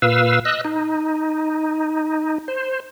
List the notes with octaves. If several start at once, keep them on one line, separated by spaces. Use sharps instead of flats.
A#2 B4 F5 E6
D#5 E6 F#6
D#4
C5